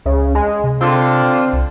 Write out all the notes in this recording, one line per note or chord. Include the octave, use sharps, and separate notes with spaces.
C#2 C#3
G#3
C3
D3 C4 D4 F4
C2